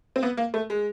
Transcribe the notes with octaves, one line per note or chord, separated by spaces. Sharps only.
C4
B3
A#3
A3
G#3